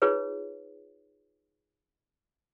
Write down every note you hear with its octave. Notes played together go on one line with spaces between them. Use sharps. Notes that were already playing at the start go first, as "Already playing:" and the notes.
D#4 F4 G#4 B4 C#5